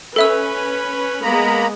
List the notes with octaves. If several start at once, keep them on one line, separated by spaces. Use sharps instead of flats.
C#4 A4 B4 E5 E6
G#3 A#3 B3 A#5 B5